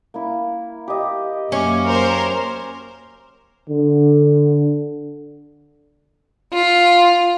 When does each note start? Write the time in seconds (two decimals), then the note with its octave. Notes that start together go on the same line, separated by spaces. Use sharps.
0.14 A#3 E4
0.88 G4 D#5
1.52 F#2 A#3 C#4 E5 D6
1.86 A#4 C5
3.70 D3
6.53 F4